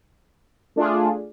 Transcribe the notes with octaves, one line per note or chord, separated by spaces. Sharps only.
A3 D4 F4 G#4